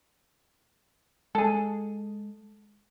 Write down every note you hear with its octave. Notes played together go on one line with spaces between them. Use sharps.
G#3 G#4 A4